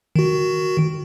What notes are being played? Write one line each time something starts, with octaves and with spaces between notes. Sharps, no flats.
D#3 F#4